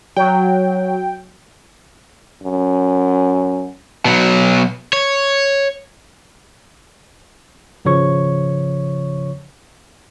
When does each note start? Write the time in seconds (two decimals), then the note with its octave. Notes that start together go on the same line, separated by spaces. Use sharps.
0.17 F#3 G5
2.43 F#2
4.05 B2 F#3
4.93 C#5
7.85 G#1 C#3 F3 C#5 C#6